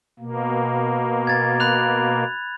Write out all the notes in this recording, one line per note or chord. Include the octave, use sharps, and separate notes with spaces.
B2 A#3
G#6 A6
B5 F#6 F7